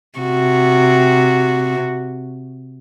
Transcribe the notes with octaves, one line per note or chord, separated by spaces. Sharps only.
C3 F#4